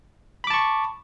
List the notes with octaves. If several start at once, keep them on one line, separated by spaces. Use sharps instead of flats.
A5 B5 C#6 D6